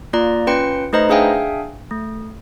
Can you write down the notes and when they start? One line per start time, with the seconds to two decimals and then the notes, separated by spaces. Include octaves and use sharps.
0.13 A#3 F4 D5 A#5
0.47 C#4 F4 B4 G5 C6 C#7
0.93 A3 D#4 B4 C5 D#5 A#5
1.09 D4 G#4 E5 F5 G5 G#5
1.91 A3